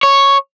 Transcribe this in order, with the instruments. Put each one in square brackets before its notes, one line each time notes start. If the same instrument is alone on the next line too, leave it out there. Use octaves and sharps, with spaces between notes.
[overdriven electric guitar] C#5